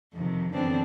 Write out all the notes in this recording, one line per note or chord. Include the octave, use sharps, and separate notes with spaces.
F2 C3 D#3
F#2 D3 E3 B3 C4 D4